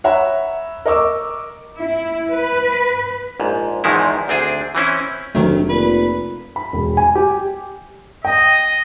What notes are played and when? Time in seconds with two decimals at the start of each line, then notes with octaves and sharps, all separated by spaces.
0.04 C#5 E5 F#5 A#5 B5
0.86 A#4 D#5 C#6 D6 E6
1.78 E4
2.30 B4
3.40 A#1 G#2
3.84 E2 G#2 D#3 F3 G#3 E4
4.28 D2 C4 D4 G#4
4.75 E3 C4 C#4 E4
5.35 F1 D2 D#3 F#3 A3
5.69 A#2 B4
6.56 B5
6.73 E1
6.97 G#5
7.15 G4
8.25 D#5 G5